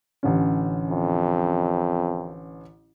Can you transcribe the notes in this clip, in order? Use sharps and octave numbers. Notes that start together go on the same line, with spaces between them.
A1 D3 C#4
F2